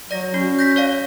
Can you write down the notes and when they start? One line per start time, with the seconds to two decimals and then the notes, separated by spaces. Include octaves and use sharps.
0.11 F#3 D5 A#6
0.34 C#4 F#4
0.59 G6 A#6 B6
0.76 C#5 D5 F5